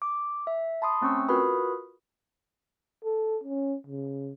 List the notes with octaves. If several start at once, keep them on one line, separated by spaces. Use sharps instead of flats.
D6
E5
A5 B5 C6 D#6
A3 C4 C#4 C#6 E6
F4 F#4 A#4 B4 B5 D#6
A4
C#4
C#3